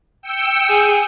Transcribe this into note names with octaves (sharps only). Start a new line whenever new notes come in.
G5 E6 C#7
G#4